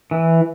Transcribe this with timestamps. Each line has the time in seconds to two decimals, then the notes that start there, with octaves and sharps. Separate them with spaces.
0.11 E3